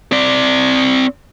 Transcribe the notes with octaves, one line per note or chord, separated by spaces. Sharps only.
C4 D5